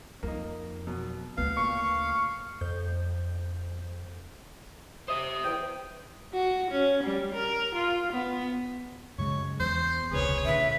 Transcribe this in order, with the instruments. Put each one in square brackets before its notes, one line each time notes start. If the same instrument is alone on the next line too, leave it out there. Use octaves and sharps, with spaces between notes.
[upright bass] F2 [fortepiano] A#3 D#4
[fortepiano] B2 F#3
[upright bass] D2 C#3 [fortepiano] B3 [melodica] F5
[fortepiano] A#2 [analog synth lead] C#6
[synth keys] F2 G6
[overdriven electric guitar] C5 E5 [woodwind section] D#6
[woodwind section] E2 G5
[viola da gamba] F#4
C#4
G3
A#4
F4
B3
[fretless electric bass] F#2 C#3 G#3 [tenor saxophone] C#5
[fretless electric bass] E2 [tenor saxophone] C5
[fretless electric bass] E1 C#2 C3 [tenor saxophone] G#4 [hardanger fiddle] B4 C#5
[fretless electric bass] A#2 D3 [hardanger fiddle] B4 [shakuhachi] E5